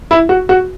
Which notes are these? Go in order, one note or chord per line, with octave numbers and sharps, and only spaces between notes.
E4
F#4
F#4